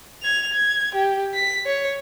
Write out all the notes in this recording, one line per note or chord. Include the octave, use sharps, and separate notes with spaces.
G#6 F7
G#6
G4
B6
C#5